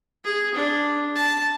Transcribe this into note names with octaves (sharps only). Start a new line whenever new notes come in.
G#4
D4
A5